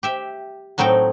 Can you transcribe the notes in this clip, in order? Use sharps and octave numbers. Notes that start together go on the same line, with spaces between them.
G4 E5 G5
A2 F#3 C4 D#4 G5